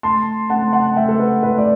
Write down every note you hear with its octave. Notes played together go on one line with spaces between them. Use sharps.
A3 A5 C6
A3 F#5 A5
F#5 A5
A3 E5 G5
A4
B4
A2 B4
D5